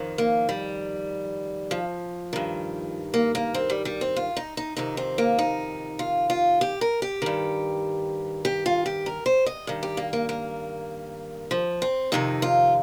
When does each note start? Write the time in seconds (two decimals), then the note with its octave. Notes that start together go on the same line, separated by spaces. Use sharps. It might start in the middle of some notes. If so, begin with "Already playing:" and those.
Already playing: F2 D#3
0.18 A#3
0.49 G3
1.71 F3
2.33 G2 D#3
3.14 A#3
3.35 A#3
3.54 C4
3.70 G3
3.85 G3
4.01 C4
4.16 F4
4.37 D#4
4.57 D#4
4.77 F2 C3 D#3 D#4
4.97 C4
5.18 A#3
5.39 D#4
5.99 F4
6.30 F4
6.61 G4
6.81 A#4
7.02 G4
7.22 G2 D#3
8.45 G4
8.66 F4
8.86 G4
9.06 A#4
9.26 C5
9.46 D#5
9.67 G2 D#3
9.83 G4
9.97 A#3
10.13 A#3
10.29 A#3
11.51 F3
11.82 C4
12.12 F2 C3 D#3 D#4
12.42 F4